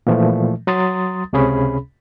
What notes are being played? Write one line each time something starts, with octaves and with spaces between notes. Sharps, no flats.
A#2 E3 F3 A3
F#3 A#5 C6 D#6 A6
C#2 C3 C#4 G#4 B5